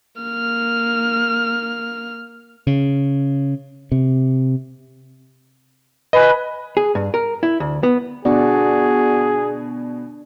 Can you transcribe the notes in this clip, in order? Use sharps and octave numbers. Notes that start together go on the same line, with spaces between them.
A#3 F6
C#3
C3
B4 D#5 G#5
G#4
G2
A#4
E4
D2
B3
B2 D4 F#4 G#4 D5